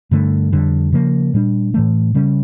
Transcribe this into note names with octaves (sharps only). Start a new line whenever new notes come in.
G2 D3 A3
F2 D3 G3
C#3 F3 A#3
A#2 G3 D4
A2 E3 A3
C#3 G3 C#4